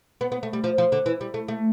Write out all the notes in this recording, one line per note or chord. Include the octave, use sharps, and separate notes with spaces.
B3
B3
A3
G3
F3
F3
D3
E3
G3
A3
A3